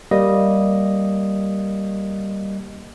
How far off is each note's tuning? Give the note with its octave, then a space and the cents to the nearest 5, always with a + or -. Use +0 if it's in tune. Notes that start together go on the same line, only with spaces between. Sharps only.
G3 -5 A#3 +0 D#5 +0